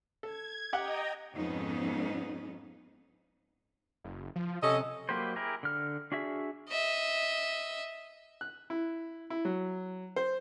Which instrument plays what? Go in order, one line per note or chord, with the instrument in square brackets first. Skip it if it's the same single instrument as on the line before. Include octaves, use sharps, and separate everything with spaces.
[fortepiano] A4 [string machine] G#6
[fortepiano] G4 F#5 [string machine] D#5 G5 A#5
[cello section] F2 G#2 B3 C#4 D#4
[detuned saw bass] F#1
F3
[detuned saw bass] C3 [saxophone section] C#4 A4 D#5
[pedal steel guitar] F#3 A#3 G4 B4 C5
E4 G4 G#4 A#4
D3 F6
D4 F#4 G#4 E5
[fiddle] D#5 E5
[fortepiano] F#6
E4
E4
F#3
C5